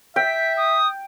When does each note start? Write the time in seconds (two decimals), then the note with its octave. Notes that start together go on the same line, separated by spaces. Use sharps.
0.16 E5 G5 B6
0.57 D#6